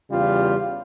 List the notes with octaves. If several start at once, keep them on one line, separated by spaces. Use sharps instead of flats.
E2 C#3 G3 F4